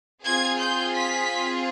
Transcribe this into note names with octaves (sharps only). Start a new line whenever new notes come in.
C4 F4 G#4 G#6
G6
B6